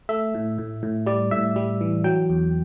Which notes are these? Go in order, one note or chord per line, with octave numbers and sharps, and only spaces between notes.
A3 E5
A2
A2
A2
G3 D5
A2 E5
G3
E3
F#3 G5
E2